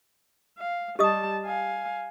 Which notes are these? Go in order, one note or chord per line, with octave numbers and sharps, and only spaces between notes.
F5
G3 G4 D#5 A5 D#6
F5 G#5